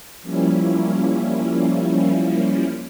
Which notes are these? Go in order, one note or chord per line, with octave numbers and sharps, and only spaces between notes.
F3 G3 A#3 C#4 E4